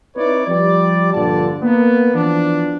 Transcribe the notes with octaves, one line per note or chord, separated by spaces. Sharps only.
C4 D#4 E4 B4 C#5 D5
F3 G3 G4 D5
A#1 G2 D3 F4 D5 A5
A#3 B3
E3 F3 B3 D4